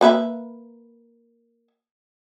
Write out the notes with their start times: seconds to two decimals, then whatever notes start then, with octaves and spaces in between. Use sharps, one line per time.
0.01 A#3 B4 E5